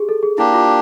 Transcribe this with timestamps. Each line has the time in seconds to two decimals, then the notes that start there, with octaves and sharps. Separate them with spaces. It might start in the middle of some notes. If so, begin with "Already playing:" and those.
Already playing: G4 G#4
0.09 A4
0.23 G#4
0.38 A#3 D4 E4 G4
0.54 F4